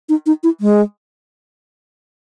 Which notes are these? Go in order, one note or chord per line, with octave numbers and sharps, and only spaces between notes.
D#4
D#4
E4
G#3